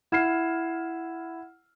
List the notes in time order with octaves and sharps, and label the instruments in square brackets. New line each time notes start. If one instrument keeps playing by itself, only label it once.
[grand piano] E4 F6 C7 [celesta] F#5 G#6 E7